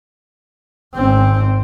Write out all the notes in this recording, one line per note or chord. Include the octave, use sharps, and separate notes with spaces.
G#1 C4